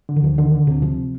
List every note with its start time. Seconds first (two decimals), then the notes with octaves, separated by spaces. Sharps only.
0.09 D3
0.16 D#3
0.23 D2 F3
0.38 D3 D#3
0.52 D3
0.67 D2 C3
0.82 C3 F3